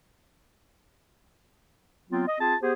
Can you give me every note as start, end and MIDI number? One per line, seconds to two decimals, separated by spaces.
2.10 2.25 54
2.10 2.25 59
2.10 2.25 60
2.10 2.25 65
2.26 2.40 75
2.40 2.54 60
2.40 2.54 65
2.40 2.54 68
2.40 2.54 81
2.61 2.73 59
2.61 2.73 67
2.61 2.73 68
2.61 2.73 72